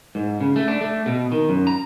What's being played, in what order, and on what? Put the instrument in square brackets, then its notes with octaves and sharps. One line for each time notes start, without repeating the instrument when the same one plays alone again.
[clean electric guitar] G#2
C#3
A3
D4
A3
B2
D#3
F#2
A#5